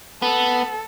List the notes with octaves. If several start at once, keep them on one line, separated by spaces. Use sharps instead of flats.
B3 A4